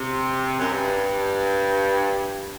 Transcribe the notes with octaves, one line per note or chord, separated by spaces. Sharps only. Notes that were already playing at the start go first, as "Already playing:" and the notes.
Already playing: C3
F#2
G2